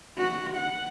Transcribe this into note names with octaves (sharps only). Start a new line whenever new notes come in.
F#4
F#5